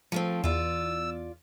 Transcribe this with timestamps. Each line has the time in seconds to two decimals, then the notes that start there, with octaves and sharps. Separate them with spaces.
0.12 F3 A3 C4
0.44 E2 F4 D5 E6